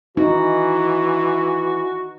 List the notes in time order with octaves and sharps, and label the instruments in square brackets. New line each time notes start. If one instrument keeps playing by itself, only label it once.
[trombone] E3 [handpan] D#4 [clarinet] F#4